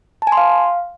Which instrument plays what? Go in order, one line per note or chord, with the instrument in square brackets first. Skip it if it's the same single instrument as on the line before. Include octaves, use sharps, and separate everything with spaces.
[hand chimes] A5
G#5
C6
F5